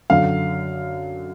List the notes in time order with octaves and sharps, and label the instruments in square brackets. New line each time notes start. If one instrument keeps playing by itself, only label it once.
[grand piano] F#2 D3 F#3 F5